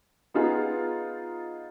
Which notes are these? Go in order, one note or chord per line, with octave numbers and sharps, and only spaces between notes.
B3 D#4 F4 G#4